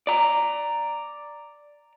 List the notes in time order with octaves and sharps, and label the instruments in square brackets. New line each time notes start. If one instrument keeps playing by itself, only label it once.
[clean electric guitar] D5 A#5